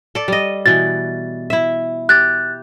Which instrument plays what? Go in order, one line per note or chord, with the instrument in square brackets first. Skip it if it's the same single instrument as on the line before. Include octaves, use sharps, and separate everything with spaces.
[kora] A4 D5
G3 D#5
[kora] B2 E3 [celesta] A6
[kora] E4 E5
[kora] G4 [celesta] F#6 A6